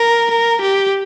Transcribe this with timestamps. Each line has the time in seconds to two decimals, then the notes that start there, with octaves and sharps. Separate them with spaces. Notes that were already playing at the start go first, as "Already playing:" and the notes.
Already playing: A#4
0.31 A#4
0.62 G4